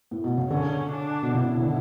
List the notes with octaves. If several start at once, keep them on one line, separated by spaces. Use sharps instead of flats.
A2
B2
C#3
D3 C#4
D4
B2
C#3 E4
D3